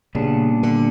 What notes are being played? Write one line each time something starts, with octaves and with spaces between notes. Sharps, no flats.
A#2 C#3 G3 B3 D4
D3